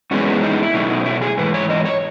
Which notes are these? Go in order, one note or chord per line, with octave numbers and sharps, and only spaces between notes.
F#2 E3 G#3 B3 C#4
D#4
E4
B2 F#3 A3 D#4
D#4
E4
G#4
G#2 E3 B4
C#5
D#5
C#5